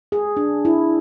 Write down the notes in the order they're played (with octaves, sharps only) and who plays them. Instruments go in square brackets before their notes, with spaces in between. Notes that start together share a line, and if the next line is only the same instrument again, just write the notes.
[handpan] G#4
D4
E4